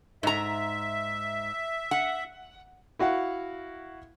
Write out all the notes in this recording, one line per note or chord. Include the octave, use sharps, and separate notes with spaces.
G#2 E5 A#5
F#5
E4 F#4 F5 F#5